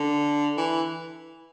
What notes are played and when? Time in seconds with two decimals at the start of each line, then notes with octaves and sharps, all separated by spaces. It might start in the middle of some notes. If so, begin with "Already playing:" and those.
Already playing: D3
0.58 E3